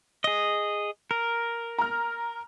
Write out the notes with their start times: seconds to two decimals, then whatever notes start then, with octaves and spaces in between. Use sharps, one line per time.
0.24 G#4 D#5
1.11 A#4
1.78 A#5 F6